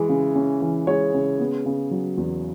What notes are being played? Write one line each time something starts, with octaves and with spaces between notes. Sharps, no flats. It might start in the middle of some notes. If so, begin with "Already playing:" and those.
Already playing: E3 G#3
C#3
C#4
E3
G#3 C#5
C#3
B3
C#3
F#3
E2